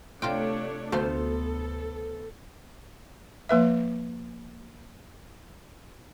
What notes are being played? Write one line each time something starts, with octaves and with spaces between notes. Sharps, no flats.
C3 A3 D4 F4 C#5 G5
D2 A3 B3 A4 C5 F5
F3 A#3 B4 E5